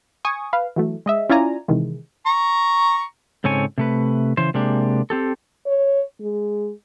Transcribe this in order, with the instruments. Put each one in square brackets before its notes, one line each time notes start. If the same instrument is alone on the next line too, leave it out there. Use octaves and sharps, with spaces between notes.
[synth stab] G#5 C#6 D#6
B4 F5
E3 F#3 A3
G#3 D#5 E5
C#4 E4 F4 D5 G#5 A#5
C3 D#3 E3 G#3
[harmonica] A#5 C#6
[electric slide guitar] G#2 C#3 C4 A4 C#5 G#5
C3 A3 B4
C#3 E3 C5
C3 G#3 A#3 D4 G4
C4 G4 A4
[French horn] C#5
G#3